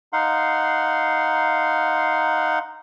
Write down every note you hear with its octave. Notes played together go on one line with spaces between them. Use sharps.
D#4 F5 F#5 C6